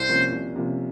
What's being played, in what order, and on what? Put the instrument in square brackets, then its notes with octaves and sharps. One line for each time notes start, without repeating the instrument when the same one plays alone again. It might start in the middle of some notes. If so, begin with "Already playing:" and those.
Already playing: [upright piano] C2 [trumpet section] C5
[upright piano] C3 F3 A#3 C#4
C2
C3 F3 A#3 C#4